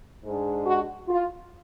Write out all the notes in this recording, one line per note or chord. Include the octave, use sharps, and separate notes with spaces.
G#2 G#3 D4
F#4
F4